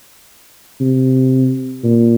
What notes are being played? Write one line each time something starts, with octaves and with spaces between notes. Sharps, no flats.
C3
A#2